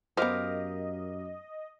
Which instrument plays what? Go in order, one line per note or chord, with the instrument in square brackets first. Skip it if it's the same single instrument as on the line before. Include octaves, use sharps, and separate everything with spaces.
[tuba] F#2 [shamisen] B3 C5 [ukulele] G4 A#4 F5 [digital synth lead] D#5